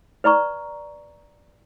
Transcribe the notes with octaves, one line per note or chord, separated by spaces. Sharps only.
B4 D5 A#5 C#6